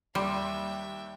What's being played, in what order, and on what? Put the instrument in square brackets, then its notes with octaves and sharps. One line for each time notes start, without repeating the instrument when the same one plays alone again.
[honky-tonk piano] D#2 C6 D6 [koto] G3 [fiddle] E5 G5